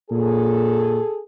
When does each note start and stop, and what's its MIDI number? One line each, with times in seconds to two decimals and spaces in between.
0.11 0.99 46
0.11 1.21 68
0.11 1.21 69